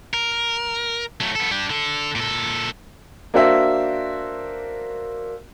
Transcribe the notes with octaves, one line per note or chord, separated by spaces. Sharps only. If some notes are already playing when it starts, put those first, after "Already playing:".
A#4
F#3 A3
B3 A4
D4 G4
D3 A4
A#2 A4
A#3 D4 F#4 C5 E5